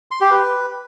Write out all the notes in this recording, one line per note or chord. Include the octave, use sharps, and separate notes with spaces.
C6
G4
B4